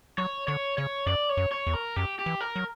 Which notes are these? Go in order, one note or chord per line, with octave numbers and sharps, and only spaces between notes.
F#3 C#5
D3 C#5
C#3 C#5
F#2 D5
C#5
F#2
C#5
E2
A#4
F#2 G4
G4
E3
A#4
F#3